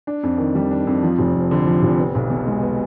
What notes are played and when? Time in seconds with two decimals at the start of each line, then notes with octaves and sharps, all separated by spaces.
0.07 D4
0.23 F2
0.38 D#3
0.55 G3
0.71 D4
0.87 F2
1.03 F3
1.19 F1
1.35 F2
1.51 D3
1.67 F3
1.83 F1
1.99 B3
2.15 B1
2.30 B2
2.46 G#3
2.62 B3